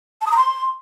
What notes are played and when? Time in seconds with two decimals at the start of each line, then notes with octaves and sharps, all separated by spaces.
0.21 A5
0.26 D#6
0.31 A#5
0.36 C6